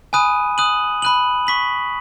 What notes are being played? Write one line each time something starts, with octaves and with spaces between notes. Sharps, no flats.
G#5 B5 D#6 F#6 D#7
D#6 F#6 D#7 F#7
B5 F#6 D#7 F#7
C#6 B6 F#7